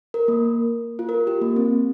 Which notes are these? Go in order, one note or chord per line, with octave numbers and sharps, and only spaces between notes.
A#4
A#3
F4
A#4
G4
A#3
C4